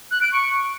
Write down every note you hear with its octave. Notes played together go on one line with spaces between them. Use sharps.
F#6
D7
C#6